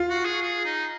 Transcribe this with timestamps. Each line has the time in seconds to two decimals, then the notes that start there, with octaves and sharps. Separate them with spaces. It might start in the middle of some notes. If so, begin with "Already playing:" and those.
Already playing: F4
0.10 F#4
0.25 G#4
0.42 G#4
0.65 D#4